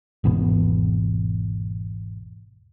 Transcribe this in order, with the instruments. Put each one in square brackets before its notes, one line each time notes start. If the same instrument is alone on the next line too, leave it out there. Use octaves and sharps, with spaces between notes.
[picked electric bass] G#1 E2 B2